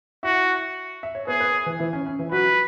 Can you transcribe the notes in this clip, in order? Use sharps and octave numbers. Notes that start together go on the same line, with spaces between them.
E4 F#4 E5
E5
C#5
B3 G#4 B4
B3 B4
E3 E4
E3 E4
C#4
C#4
E3 E4
F#3 F#4 B4